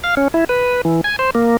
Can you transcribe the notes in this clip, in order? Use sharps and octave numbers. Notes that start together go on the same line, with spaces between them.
F5
C#4
E4
B4
E3
G#5
C5
A#3